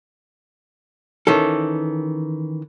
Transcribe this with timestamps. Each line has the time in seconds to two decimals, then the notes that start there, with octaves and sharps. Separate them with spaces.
1.27 D#3 E3 C#4 A4